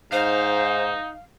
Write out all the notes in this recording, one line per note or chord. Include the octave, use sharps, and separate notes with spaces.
G#2 D#4 C5 F5